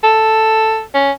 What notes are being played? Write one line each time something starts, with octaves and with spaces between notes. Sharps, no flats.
A4
C#4